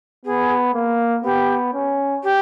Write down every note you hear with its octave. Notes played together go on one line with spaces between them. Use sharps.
B3 G#4
A#3
B3 G4
C#4
G4